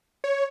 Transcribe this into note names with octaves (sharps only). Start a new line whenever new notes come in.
C#5